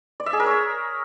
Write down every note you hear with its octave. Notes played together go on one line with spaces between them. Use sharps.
D5
E5
G#4
A#4
C#5